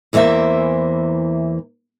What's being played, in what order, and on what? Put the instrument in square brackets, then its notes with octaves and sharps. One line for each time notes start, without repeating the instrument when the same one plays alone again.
[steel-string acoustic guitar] E2 E3 A#3 C5 E5